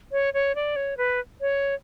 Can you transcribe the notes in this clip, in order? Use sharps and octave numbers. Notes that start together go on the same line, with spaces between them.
C#5
C#5
D5
C#5
B4
C#5